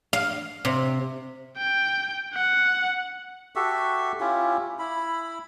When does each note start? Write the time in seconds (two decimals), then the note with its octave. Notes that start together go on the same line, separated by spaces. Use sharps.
0.13 F5
0.65 C3
1.57 G5
2.35 F#5
3.56 F#4 G4 A4 E5
4.20 C#4 E4 F4 G4
4.79 E4 B5